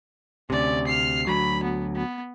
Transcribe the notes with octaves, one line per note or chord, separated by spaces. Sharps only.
D2 C3 C#4 D5
F6 C7
D2 F#3 B5
B3
B3